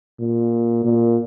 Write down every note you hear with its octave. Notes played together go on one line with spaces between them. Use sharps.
A#2
A#2